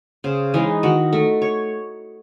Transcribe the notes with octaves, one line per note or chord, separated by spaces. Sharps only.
C#3 C5
E3 G#3 D#4
D#3 F#4
A3
C#5